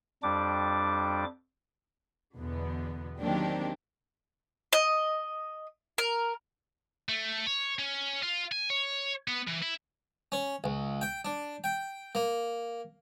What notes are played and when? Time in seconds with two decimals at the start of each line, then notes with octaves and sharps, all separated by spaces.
0.23 F2 G3 D4 D6
2.38 E2 B2 D3 B3
3.19 D#3 F#3 A#3 C4 D4 G4
4.73 D#5
5.98 A#4
7.09 A3
7.47 C#5
7.79 C#4
8.23 F4
8.52 G#5
8.70 C#5
9.28 B3
9.47 E3
9.62 E4
10.32 C#4
10.64 C#2
11.01 G5
11.25 D4
11.64 G5
12.15 A#3